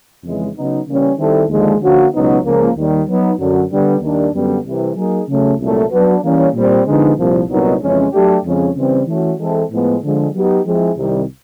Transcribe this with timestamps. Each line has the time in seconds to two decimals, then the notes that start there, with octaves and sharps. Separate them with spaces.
0.23 F2 C#3 E3 G#3
0.55 C#3 F#3 B3 D#4
0.86 C#3 E3 G3 A#3 C#4
1.17 D#3 G3 C4 E4 A4
1.48 D#2 D3 F3 G#3
1.80 D3 F3 A#3 C#4 F#4
2.12 C#2 B2 F#3 B3 D#4
2.44 C#2 C#3 F3 A#3
2.75 D#2 D#3 G3
3.06 F#3 B3 D#4
3.38 F#2 D3 F#3
3.71 D3 G3 B3
4.01 D#2 D#3 G3 A#3 D4
4.33 F#2 D3 G3 B3
4.64 C2 C3 E3
4.96 F#3 A#3 D#4 G#4
5.28 C#3 F#3 A3
5.59 C2 A#2 F#3 A3
5.91 F#3 B3 D4 F#4 B4
6.23 E3 G3 A#3 C#4
6.54 A#2 G3 C4
6.86 D3 F3 G#3 B3 D#4
7.17 C2 A#2 F3
7.49 C2 A#2 F#3 B3 D#4
7.80 F2 C#3 E3 G#3 C#4
8.12 F#3 A3 D4 G4
8.44 F2 C#3 F3 G#3 C#4
8.76 C#3 E3 G3 C4
9.07 E3 A3 C#4 F#4
9.38 E3 G#3 C4 E4 A4
9.70 A2 F3 G#3 B3
10.02 D3 F3 G#3
10.33 F#3 B3 D#4 G4
10.65 F3 G#3 C4 E4 G#4
10.97 C2 C3 D#3 G3